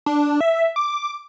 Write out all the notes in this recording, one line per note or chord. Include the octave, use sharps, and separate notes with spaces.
D4
E5
D6